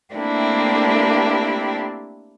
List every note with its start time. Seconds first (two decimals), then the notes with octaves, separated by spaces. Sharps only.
0.14 A3 A#3 C4 D4 E4 G4